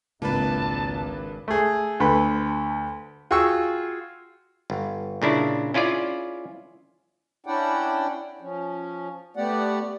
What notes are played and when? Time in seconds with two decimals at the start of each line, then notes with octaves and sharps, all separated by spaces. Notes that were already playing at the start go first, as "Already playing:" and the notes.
0.22 G#1 C#2 A#3 D4 B4 A5
1.48 A3 G#4
2.00 D2 A4 B4
3.31 F4 F#4 G#4 G5 C#6 E6
4.70 G1
5.22 A#2 C#3 D4 E4
5.74 C#4 E4 F4 G#4 D5
7.46 C#4 D4 E4 D5 F#5 G5
8.41 F3 C#4
9.37 A3 B3 G4 D5 F#5